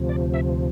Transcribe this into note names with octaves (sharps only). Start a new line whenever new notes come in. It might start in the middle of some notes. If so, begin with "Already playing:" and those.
Already playing: D2 C3 F3
D5
E5